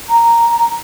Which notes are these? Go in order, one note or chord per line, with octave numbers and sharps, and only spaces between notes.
A#5